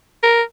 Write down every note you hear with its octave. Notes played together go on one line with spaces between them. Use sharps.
A#4